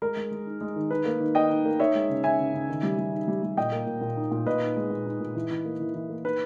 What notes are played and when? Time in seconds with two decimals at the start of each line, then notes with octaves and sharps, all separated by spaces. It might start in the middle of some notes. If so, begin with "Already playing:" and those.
0.02 G#3 A#4
0.17 G#3
0.32 G#3
0.46 D#4
0.61 G#3
0.76 D#3
0.90 D#4 B4
1.06 A#3
1.20 D#3
1.35 D#4 D#5 G5
1.50 D#4
1.65 A#3
1.80 D#4 C#5 E5
1.95 G#3
2.10 C#3
2.24 C#3 E5 G#5
2.39 C#3
2.54 C#3
2.69 D#3
2.83 G3
2.98 G3
3.13 D#4
3.28 G3
3.43 G3
3.57 A#2 D#5 G5
3.72 A#3
3.87 A#2
4.01 A#2
4.17 D#4
4.31 A#2
4.46 A#2 B4 D#5
4.62 D#4
4.76 G#3
4.91 A#2
5.06 D#4
5.20 A#2
5.35 E3
5.50 E3
5.65 A#3
5.80 E3
5.95 E3
6.10 A#3
6.24 D#4 B4